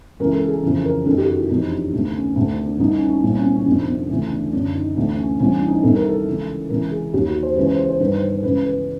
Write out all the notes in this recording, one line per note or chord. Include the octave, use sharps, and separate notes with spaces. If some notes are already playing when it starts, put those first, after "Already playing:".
C#2 C#3 E3 A#4
A4
G#4
F2 C#3 E3
A#4
F#2 D#3 A4
G4
F#4
E4
F2 C3 E3 D#4
D4
D2 C3 D#3
C#4
D2 C3 D#3 D4
D4
D4
C2 C3 D#3 D#4
C#4
C#4
C2 A#2 C4
C#4
C4
C#4
F2 C3 D#3 D4
C4
D2 C#3 E3 C#4
D4
F#2 D3 D4
D#4
D2 C3 E3 D4
D4
C#4
C2 C3 E3 C#4
D4
D#4
C2 C3 D#3 A4
A#4
A4
C#2 C#3 E3
C#2 C3 E3 A#4
G#4
D#2 D#3 G4
F#4
C5
C#2 C#3 E3 B4
C5
C5
C5
G2 D#3 B4
C5
C5
C#2 C#3 E3 B4
B4